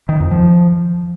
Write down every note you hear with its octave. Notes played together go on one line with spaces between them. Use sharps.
D#3
F2
F3